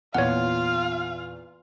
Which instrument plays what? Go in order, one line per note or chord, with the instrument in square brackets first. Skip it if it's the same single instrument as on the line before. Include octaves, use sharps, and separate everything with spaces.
[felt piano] E2 A#2 [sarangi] F4 [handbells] C#5 F#5 [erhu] F5